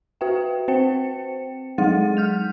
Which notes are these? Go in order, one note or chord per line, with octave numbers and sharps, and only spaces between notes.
F#4 B4 E5 G5
C4 C5 G5 C#7
F#3 G#3 D#4 G#4 F#5 A6
F6 G6 F7